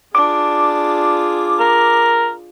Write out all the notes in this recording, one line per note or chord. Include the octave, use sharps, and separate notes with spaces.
D4 F4 G#4 D6
A#4